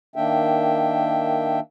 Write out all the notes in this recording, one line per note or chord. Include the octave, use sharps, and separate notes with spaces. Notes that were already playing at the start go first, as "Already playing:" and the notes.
D#3 A#3 D4 E5 G5